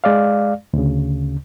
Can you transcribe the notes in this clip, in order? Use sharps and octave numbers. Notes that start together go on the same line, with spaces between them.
G#3 D5 F5
D2 C#3